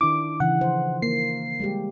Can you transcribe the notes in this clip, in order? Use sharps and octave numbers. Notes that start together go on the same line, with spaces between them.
D#3 D4 E4 D6
C#3 E3 F#5
F3 C5
A#3 C7
G3 G#3 G4